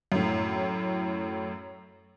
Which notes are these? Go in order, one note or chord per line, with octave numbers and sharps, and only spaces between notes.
F#2 A2